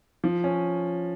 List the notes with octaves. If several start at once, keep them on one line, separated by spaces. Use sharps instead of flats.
F3
C#4